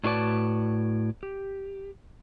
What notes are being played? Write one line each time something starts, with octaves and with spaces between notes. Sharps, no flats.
A2 D4 F#4 B4 D5 A5
G4